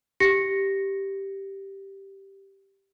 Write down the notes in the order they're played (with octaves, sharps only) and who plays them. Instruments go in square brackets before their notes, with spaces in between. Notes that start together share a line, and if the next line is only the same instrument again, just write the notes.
[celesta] G4 A#6 C#7